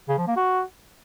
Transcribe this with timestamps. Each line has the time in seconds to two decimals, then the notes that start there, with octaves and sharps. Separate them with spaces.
0.08 C#3
0.18 F3
0.27 A#3
0.37 F#4